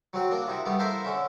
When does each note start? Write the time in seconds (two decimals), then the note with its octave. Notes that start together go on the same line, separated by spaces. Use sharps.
0.13 F#3 C4 F#4
0.31 A#3 D4
0.47 C3 D#4 E4
0.66 G3 A3 B3
0.79 E4 A4 A#4 C5 E5 F5
1.04 D3 C#4 E5